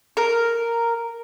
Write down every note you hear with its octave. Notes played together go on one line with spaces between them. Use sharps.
A#4